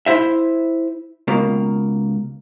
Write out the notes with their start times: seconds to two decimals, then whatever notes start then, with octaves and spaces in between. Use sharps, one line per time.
0.06 E4 C5 E5
1.28 C#2 B2 A#3